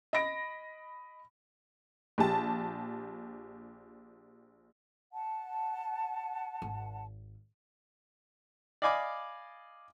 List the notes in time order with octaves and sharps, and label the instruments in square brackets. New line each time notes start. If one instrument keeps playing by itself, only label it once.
[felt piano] D#5 B5 A#6 D7
[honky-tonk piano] A#1 G4 A5
[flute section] F#5 A5
[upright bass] G#1
[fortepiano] D5 D#5 F5 G#5 B5 D6